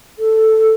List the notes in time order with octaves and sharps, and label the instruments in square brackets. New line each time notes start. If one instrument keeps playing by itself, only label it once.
[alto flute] A4